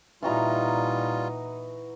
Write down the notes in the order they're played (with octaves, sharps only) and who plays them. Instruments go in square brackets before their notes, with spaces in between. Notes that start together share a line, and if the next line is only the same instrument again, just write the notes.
[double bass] A#2 D#4 [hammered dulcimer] E3 F#4 A#5 [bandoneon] G3 F4